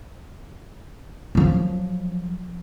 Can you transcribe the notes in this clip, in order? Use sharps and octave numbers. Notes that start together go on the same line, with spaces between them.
F3 F#3